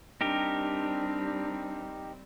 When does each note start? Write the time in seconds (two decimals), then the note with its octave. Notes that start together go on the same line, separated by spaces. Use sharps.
0.21 G3 C4 D4 D#4 G4 A#4